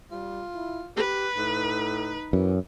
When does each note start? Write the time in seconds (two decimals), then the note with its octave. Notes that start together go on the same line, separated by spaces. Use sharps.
0.11 G3 F4
0.54 E4
0.96 G4 B4
1.37 A2 D#4
2.33 F#2 E3